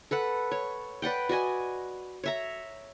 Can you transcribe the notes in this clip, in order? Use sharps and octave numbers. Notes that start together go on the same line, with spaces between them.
A4 B4 F#5
C#5
B4 D5 F#5 G5
F#4 D5 D#5 G#5
C#5 E5 A#5